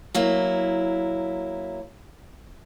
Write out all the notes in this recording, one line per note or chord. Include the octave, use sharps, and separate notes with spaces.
F#3 A#3 E4